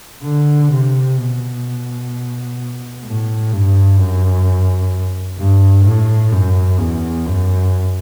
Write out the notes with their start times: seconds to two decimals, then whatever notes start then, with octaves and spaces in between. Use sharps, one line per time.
0.24 D3
0.72 C3
1.18 B2
3.06 A2
3.52 G2
3.99 F#2
5.39 G2
5.85 A2
6.32 F#2
6.79 E2
7.26 F#2